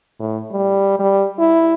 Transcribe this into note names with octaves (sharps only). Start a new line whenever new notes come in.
A2
G3
G3
E4